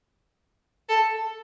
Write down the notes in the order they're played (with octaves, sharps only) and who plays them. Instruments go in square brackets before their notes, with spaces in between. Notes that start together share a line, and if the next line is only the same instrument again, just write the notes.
[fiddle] A4